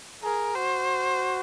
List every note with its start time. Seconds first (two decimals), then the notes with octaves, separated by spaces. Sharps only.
0.23 G#4 A#4
0.55 F#4 C5